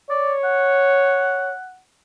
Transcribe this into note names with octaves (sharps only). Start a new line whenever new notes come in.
C#5 D5
F#5